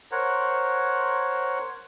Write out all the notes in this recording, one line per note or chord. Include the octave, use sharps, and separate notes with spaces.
A#4 C5 C#5 F#5